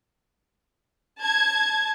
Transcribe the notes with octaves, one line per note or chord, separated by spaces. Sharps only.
A5 G#6